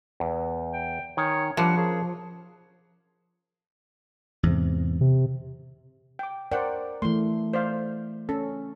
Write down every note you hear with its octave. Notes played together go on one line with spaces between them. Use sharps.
E2
G5
D#3 C#5 G#5
F3 G3 D4 F#5
C#4 G#4 A#4 F5
E2 G#2 C3
C3
G5 D6
A#4 C5 D5 F#5 G5
E3 A3 C6
C5 D5 F5
C#4 A4